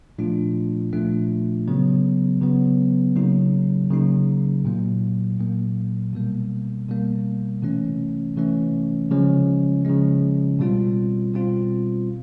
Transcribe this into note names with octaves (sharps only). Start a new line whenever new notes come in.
A#2 F3 A3 D4 F4
A#2 F3 A3 D4 F4
C#3 F#3 B3
C#3 F#3 B3
C#3 F#3 A#3 D#4
C#3 F#3 A#3 D#4
A#2 F#3 A#3
A#2 F#3 A#3
B2 G3 A#3
B2 G3 A#3
C3 E3 A3 C#4
C3 E3 A3 C#4
C#3 F3 G#3 C#4
C#3 F3 G#3 C#4
B2 G3 C4 F4
B2 G3 C4 F4